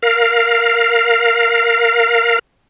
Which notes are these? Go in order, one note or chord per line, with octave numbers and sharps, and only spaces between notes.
A#4 F5